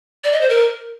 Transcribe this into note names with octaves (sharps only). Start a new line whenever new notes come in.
D5
D#5
C5
A#4